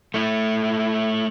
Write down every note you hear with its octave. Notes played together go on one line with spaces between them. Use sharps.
A3 E4